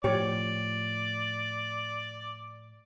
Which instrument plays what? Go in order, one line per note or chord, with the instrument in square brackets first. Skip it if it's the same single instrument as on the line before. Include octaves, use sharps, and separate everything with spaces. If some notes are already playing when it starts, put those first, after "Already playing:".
[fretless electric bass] A2 F3 [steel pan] G4 C#5 [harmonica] D5